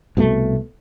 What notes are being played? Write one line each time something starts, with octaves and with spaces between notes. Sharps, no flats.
C2 B2 F3 A3